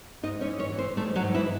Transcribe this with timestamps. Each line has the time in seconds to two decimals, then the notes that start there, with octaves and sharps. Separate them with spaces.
0.23 G#2 D#4 D#5
0.41 C#4 C#5
0.47 E3
0.59 C#4 C#5
0.72 E3
0.78 C4 C5
0.97 G#2 A3 A4
1.16 F#3 F#4
1.22 G#2
1.34 E3 E4